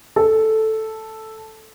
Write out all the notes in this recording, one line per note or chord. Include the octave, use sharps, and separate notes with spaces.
A4